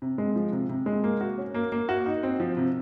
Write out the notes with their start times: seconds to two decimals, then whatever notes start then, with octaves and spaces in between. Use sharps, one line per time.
0.02 C3
0.18 G#3
0.36 F3
0.52 C3
0.69 C3
0.86 G#3
1.04 A#3
1.21 F#4
1.38 C#4
1.54 A#3
1.72 A#3
1.89 F#4
2.06 D#4
2.23 C4
2.40 F3
2.57 C3